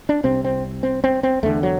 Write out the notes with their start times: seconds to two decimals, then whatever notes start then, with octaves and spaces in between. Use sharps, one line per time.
0.09 D4
0.24 C2 C3 C4
0.45 C4
0.83 C4
1.04 C4
1.23 C4
1.43 E2 D3 A3
1.63 F#3